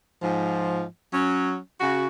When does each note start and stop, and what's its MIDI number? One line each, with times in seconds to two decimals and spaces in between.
0.22 0.83 44
0.22 0.83 53
1.13 1.57 54
1.13 1.57 61
1.80 2.07 49
1.80 2.07 66